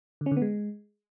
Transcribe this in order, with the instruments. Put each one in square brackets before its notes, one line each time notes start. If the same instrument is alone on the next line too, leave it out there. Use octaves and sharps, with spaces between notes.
[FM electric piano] D3
C#4
D3
B3
G#3